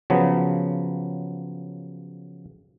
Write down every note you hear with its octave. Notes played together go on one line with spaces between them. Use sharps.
C#3 F3 F#3 B3